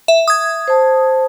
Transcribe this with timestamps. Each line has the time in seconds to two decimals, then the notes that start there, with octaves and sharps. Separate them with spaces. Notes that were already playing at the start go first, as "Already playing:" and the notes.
0.08 E5
0.28 D#6 G#6
0.68 C5 A5